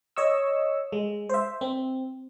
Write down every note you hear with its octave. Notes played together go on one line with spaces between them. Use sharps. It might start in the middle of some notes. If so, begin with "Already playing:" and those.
C#5 D#5 C#6 E6
G#3
C5 E5
C4